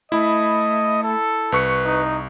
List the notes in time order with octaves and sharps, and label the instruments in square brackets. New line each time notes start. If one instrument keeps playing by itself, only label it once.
[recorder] A3 [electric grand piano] E4 B5 [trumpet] D#5
[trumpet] A4
[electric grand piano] C2 C#6 C#7 [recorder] B4
[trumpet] D#4